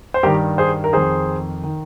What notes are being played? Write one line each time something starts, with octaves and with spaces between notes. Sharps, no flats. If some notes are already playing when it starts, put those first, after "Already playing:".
C5
G2 D#3 G4 A#4
G#4 C5
A#4
F2 D#3 G#4 C5
D#3